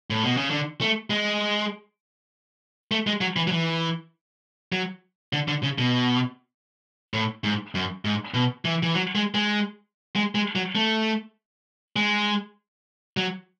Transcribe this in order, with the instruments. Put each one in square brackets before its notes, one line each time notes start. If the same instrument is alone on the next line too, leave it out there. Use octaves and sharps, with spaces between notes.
[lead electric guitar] A2
B2
C#3
D3
A3
G#3
A3
G#3
F#3
E3
F#3
E3
F#3
D3
D3
C#3
B2
A2
G#2
F#2
G#2
B2
E3
E3
F#3
G#3
G#3
G#3
G#3
F#3
A3
G#3
F#3